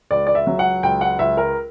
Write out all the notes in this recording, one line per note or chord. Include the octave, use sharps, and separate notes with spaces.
C#2 D5
D5
E5
F#3
F#5
C#2 G5
F#5
C#2 E5
A#4